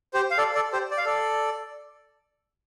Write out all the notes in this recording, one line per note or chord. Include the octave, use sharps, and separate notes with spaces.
G4 C5
F5
A4 D5
A4 D5
G4 C5
D5
F5
A4 D5